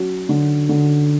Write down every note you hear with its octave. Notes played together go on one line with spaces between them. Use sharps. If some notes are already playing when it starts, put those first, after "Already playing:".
Already playing: F#3 C#4
D3
D3